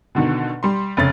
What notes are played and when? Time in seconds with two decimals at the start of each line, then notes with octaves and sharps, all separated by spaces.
0.15 B2 D3 D#3
0.63 G3 C6
0.97 F1 C#3 A6